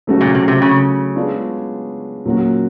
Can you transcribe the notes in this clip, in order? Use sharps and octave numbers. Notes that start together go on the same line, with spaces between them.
C#3 F#3 A3 C#4 F#4
A#2
C3
C3
C#3
G#3 B3 D4 F4
A#2 F#3 A#3 C#4 F#4